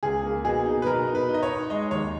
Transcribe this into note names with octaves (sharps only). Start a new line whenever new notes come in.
C#2 G#4
A#3
B2 G#4
D#4
B4
B2 A#4
D#4
B4
D#4
D#5
C#5
D#4
G#3 D#5
D#2 C#5